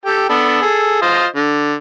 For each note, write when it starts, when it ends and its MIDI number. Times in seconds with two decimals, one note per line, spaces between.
0.05 0.27 67
0.05 0.27 69
0.05 0.27 79
0.29 0.61 59
0.29 0.61 62
0.29 0.61 69
0.62 1.01 68
0.62 1.01 69
1.02 1.26 65
1.02 1.26 72
1.02 1.26 75
1.36 1.74 50